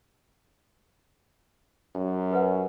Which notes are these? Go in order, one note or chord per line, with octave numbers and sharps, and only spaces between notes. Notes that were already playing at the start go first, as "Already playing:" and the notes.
F#2
G4 B4 F#5